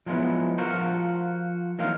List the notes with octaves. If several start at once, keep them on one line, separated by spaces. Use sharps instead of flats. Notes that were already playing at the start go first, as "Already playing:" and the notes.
F3 F#3 G#3 A#3 B3 E4
F3 F4 F#4 A#4 C5
E3 F#3 A#3 C4 D#4 F5